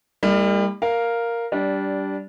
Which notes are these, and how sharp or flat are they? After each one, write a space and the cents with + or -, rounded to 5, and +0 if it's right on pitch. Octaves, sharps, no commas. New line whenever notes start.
G3 +30 A#3 -35 E4 -25
A#4 +0 F5 +0
G3 -10 D4 -20